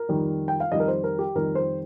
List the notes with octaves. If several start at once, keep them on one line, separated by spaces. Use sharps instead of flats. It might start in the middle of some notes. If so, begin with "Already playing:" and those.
Already playing: A#4
F2 D#3 G3
G5
F5
F2 D#3 G3 D#5
A#4
C5
A#4
G4
F2 D#3 G3 A#4
C5